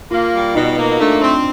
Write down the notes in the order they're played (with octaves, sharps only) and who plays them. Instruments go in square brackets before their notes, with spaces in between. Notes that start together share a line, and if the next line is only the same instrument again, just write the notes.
[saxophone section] A#3 [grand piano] F4
[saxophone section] G3
[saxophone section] B2 [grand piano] D#4
[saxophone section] A#3
[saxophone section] A3 [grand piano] D4
[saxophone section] C4